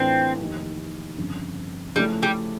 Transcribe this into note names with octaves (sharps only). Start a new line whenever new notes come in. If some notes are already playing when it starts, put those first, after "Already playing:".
Already playing: A2 E3 A3 C4 D4 F4
F1 D#2 D#3
G1 F2 C#3
C#3 F3 G3 A3 C#4 E4
G3